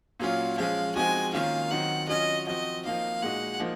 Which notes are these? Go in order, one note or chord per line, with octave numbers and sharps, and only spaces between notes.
A#2 F#3 C#4 F4 F5
F3 G#3 C#4 F5
F3 G#3 C4 D#4 F#4 G#5
D#3 A#3 C#4 F4 F5
D#3 F#3 C4 D#4 F#5
F#3 C#4 F4 D#5
F3 C4 F#4 D#5
F3 A#3 D#4 F5
A#2 G#3 D#4 F#4 F#5
F3 A#3 D#4